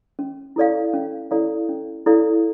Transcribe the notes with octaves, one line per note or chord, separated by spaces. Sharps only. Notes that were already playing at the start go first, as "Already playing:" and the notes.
C#4
E4 A4 D5 F5
C#4
E4 A4 D5 F5
C#4
E4 A4 D5 F5